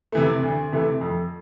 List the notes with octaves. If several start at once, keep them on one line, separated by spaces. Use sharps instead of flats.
C3 E3 A3
D2
C3 E3 A3
F2